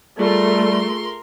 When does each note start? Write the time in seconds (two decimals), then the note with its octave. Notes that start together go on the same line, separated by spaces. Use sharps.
0.19 G3 A3 F4 G#4 A#4 C6